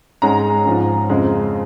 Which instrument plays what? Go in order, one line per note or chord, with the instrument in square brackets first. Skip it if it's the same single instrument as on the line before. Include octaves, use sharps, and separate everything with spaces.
[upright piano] G#2 G#3 C#4 A#5
G#2 F3 C#4
F2 C#3 F3 G#3 C#4